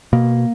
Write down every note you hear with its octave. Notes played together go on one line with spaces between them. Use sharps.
B2 A#3